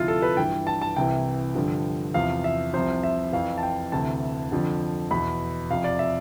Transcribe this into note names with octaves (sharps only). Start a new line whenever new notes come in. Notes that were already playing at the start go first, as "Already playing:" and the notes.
Already playing: D2 C3 F3 E4 F4
A4
B4
G2 E3 G5
A5
A5
C2 C3 E3 G5
G2 D3 F3
E2 C3 F3 F5
E5
C2 C3 F3 C5
E5
F2 E3 F5
A5
G5
D2 C3 E3 A5
F2 D3 F3
E2 B2 B5
F2 C3 F3 F5
D5
E5